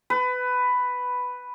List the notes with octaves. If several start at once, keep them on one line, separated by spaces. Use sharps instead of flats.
B4